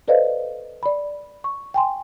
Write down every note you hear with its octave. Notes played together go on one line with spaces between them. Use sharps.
A4 B4 C5 D5 D#5 F5
D5 B5
C#6
G5 G#5 C6